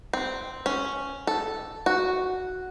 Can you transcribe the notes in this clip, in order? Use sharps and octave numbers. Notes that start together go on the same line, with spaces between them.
C4
C#4
A4
F#4